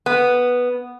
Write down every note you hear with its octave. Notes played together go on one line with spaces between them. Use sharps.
B3